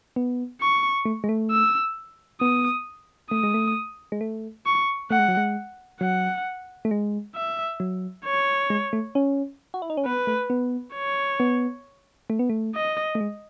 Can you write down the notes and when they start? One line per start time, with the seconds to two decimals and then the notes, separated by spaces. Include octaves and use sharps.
0.16 B3
0.61 C#6
1.05 A3
1.24 G#3
1.29 A3
1.51 E6
2.41 B3 D#6
3.31 A3 D#6
3.43 G#3
3.54 A3
4.12 G#3
4.21 A3
4.66 C#6
5.10 A3 F#5
5.19 G#3
5.28 F#3
5.37 G#3
6.01 F#3 F#5
6.85 A3
6.91 G#3
7.36 E5
7.80 F#3
8.25 C#5
8.70 G#3
8.93 A3
9.15 C#4
9.74 F#4
9.82 E4
9.90 D#4
9.97 C#4
10.06 B3 B4
10.27 A3
10.50 B3
10.95 C#5
11.40 B3
12.30 A3
12.39 B3
12.50 A3
12.75 D#5
13.15 A3
13.21 G#3